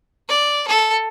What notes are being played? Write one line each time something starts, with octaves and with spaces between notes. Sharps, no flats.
D5
A4